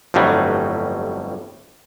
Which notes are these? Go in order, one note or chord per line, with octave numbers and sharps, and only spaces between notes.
G1 F2 A2 F#3 G3